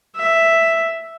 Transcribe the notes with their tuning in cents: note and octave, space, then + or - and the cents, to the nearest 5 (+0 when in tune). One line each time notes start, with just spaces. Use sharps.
E5 +5